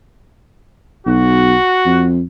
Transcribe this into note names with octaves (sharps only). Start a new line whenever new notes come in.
B1 F#4
F2